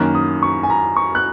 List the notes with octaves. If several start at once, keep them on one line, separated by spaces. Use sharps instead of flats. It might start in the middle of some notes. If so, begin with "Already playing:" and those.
Already playing: F#2 D#3 A#3 C#4 F#6
D#6
C#6
G#5
A#5
C#6
F#6